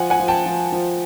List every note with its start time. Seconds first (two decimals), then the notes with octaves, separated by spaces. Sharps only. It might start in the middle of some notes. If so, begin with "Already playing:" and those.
Already playing: F3 F#5 G#5
0.10 F#5 G#5
0.20 F3
0.28 G5 A5
0.46 F3
0.72 F3